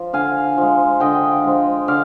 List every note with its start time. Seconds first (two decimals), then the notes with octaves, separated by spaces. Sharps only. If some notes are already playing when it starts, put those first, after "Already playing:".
Already playing: F3
0.13 D3 F5 G#5
0.57 F3 G#3
1.00 D3 D#5 G5
1.44 F3 G#3
1.87 D3 D5 F5